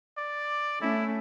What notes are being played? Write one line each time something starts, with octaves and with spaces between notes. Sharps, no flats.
D5
A3 C#4 E4